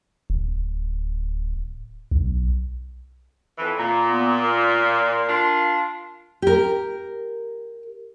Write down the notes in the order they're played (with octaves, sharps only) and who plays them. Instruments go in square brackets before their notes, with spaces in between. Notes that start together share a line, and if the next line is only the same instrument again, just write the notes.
[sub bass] D1
B1
[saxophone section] F2 E3
[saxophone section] A#2 [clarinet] A#5
[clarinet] B3
A#4
[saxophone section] D4 F4
[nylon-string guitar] G4 A#4